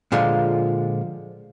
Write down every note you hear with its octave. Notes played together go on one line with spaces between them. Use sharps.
A#2 D3 F3 G#3 F4